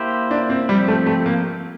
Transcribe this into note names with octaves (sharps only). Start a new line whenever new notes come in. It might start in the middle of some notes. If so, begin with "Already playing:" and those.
Already playing: A#3 E4 G4 C5
D4
C4
F3 G3 C4 G4
A3
A3
A#3